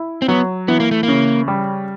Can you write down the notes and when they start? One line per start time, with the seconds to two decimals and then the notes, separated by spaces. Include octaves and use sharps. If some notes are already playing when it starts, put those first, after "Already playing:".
Already playing: E4
0.22 C4
0.28 F#3 B3
0.68 E3 B3
0.80 A#3
0.91 A3
1.03 C#3 A#3
1.48 G3